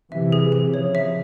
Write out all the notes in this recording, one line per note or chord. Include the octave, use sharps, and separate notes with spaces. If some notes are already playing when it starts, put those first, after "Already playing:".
C3 E3 E5
G#4
G#4
C#3 F3 C#5
E5